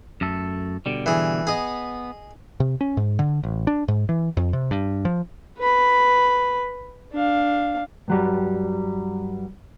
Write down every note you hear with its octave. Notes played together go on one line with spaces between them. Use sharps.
F#2 A3 A4
B2 D3 G3
E3 G#4
B3 G#4 D#5
C3
C#4
G#2
D3
A1
D4
G#2
E3
F2
C3
G2
F3
B4 B5
D4 F5
G2 F#3 G3